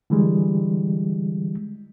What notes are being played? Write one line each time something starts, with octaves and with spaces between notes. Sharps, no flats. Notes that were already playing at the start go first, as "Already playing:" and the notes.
D3 E3 G3 G#3